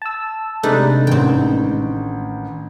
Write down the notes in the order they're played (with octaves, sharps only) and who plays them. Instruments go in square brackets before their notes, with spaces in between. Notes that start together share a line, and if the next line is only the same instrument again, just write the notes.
[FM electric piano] A5 E6
[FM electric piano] C3 G#3 A3 [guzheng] D4 D#4 B4
[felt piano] A1 D#3 [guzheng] C4 G5